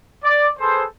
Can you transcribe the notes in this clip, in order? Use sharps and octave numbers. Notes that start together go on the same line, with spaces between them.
D5
G#4 A4 B4 C5